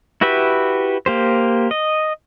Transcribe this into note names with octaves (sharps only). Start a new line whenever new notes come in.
E4 F#4 G4 B4 E5
A#3 G4 C5
D#5